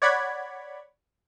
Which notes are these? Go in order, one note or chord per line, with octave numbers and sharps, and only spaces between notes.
C#5 D5 F#5 B5 G#6